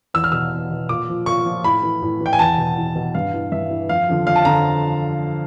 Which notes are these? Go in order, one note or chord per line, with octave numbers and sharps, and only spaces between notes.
E2 E6
F6
B2 E6
E2
B2
A#2 D6
F3
A#2 C#6
F3
A2 B5
E3
A2
E3
G5
G#5
E2 A5
B2
E2
B2
G2 F5
E3
G2 E5
E3
F2 F5
D3 F3
F2 F5
A5
D3 F3 A#5